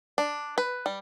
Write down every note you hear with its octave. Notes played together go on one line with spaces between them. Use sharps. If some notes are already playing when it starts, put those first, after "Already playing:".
D4
B4
G3